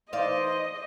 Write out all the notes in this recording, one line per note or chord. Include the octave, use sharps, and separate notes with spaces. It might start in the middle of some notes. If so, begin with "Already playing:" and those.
E3 D#4 C5 D5 D#5 F5